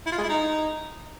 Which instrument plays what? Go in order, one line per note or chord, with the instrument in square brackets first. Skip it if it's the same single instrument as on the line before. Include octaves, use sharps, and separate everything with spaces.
[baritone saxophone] E4
F4
G#3
E4
D#4